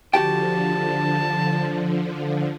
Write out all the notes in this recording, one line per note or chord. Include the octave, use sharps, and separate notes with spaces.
D3 F3 F#4 G4 G5 A5